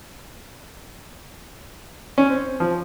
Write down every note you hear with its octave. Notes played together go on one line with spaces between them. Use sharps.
C#4
C4
F3